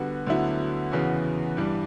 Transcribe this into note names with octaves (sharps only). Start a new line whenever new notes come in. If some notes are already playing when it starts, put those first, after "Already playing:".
Already playing: D3 G3 B3 F#4
D2 D3 F#3 B3 E4
E2 C#3 E3 B3 F#4
G2 E3 G3